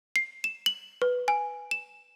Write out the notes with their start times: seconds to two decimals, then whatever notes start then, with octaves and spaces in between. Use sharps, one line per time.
0.16 C7
0.44 E7
0.66 F#7
1.02 B4
1.28 G#5
1.71 E7